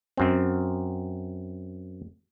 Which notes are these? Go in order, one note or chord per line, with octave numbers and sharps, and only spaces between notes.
F#2 C4